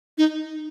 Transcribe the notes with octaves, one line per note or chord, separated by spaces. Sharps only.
D#4